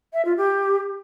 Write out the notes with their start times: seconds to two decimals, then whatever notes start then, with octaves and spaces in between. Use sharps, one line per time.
0.13 E5
0.25 F4
0.37 G4